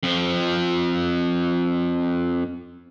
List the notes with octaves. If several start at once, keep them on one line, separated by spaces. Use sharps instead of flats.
F2 F3